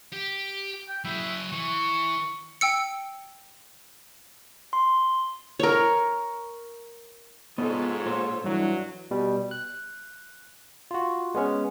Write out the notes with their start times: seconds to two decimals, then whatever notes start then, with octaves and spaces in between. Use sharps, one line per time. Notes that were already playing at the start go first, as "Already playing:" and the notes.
0.12 G4
0.88 G5
1.05 F#3 E4 G#4
1.52 E3 C#6
2.61 G5 E6 C#7
4.73 C6
5.59 A#4 C#5
7.58 G#2 B3 F4 A4 C#5 D#5
8.06 A#2 C5
8.44 G2 E3 F#3
9.11 B2 G3
9.51 F#6
10.91 F4 F#4
11.35 G#3 B3 C#4